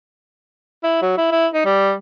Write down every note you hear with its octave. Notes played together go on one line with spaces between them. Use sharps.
E4
F#3
E4
E4
D#4
G3